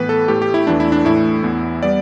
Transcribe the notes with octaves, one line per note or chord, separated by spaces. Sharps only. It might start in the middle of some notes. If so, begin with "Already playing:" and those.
Already playing: A2 E3 B3 B4
A4
A2 A3 G4
G4
E4
E2 E3 A3 D4
E4
D4
A2 E3 A3 E4
E2 E3 B3
G3 B3 D5